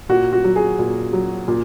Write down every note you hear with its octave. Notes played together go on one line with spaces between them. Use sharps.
A#2 F#4
F#4
F#3
G#4
A#2
F#3
A#2